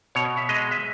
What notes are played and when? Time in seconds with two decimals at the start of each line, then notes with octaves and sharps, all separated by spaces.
0.15 B2 C#5
0.37 E5
0.49 G#3 D#5
0.71 E5